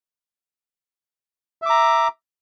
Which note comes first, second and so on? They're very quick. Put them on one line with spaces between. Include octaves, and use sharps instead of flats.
E5 D6 A#5